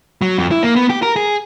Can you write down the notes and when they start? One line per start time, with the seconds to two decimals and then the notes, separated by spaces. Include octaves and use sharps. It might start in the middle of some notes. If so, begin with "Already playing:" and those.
0.22 F#3
0.39 F2
0.51 E4
0.63 A#3
0.76 B3
0.90 G4
1.02 A#4
1.16 G#4